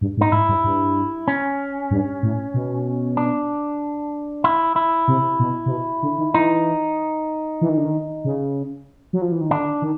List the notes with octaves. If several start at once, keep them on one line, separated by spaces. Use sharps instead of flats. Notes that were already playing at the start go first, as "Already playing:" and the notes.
G2
G#2
D#4
G#2 E4
G2
G2
C#4
G2
A2
B2
D4
E4
E4
C3
B2
C3
B2
D3
D#3
E3 D#4
E3
D#3
D3
D#3
C#3
F#3
F3
E3
D#3
D3 D4
D#3